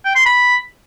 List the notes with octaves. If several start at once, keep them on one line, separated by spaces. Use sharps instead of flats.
G5
C6
B5